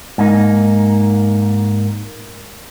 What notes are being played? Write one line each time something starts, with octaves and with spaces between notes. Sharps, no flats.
G#2 A#3 D#4